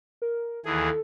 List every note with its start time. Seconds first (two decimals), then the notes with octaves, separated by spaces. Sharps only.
0.22 A#4
0.65 D#2 E3 G#4 A4